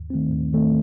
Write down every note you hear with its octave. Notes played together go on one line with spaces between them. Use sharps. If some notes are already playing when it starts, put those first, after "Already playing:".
Already playing: D#2
D#3 A3 C4
D#2
D#3 A3 C4